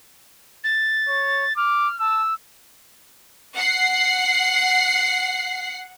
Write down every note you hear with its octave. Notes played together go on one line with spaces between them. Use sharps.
A6
C#5
D6 F6
A5 E6
F#5 C7